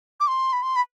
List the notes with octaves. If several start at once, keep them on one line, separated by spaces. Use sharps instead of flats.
D6
C6
B5
C6
B5